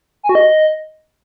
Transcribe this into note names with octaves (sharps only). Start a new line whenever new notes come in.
G#5
F#4
D#5